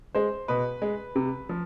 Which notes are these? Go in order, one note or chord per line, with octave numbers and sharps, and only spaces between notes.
G#3 C5
B2 B4
G#3
C3
F3